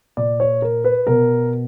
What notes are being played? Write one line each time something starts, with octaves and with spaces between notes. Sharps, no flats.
A#2 D5
C#5
A#4
B4
B2 A#4